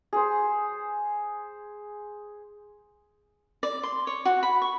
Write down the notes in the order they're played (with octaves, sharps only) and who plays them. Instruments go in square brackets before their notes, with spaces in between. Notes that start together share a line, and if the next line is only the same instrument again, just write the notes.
[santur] G#4 C5
[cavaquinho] D5
C6
C#5
F#4
B5
C#6